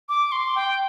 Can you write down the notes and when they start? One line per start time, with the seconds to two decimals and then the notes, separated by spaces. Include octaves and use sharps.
0.09 D6
0.32 C6
0.55 G5